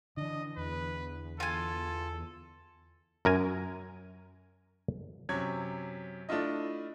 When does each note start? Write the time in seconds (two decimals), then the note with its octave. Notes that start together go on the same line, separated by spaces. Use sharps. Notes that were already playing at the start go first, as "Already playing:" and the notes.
0.17 D3 E3 D4 D#5
0.57 E2 B4
1.40 F4 A4 G#5
3.25 F#2 A#4 G#5
5.29 F#2 C3 C#5 G#6
6.29 A3 D4 E4 F4 D#5